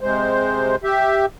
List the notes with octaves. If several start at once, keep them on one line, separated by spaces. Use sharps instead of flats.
C3 G#3 C5
G4 E5